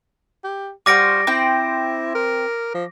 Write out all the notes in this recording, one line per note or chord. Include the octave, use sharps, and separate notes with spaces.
G4
G3 F4 F#4 C5 D6 A#6 D7
C4 E4 C5 G5
A#4
F3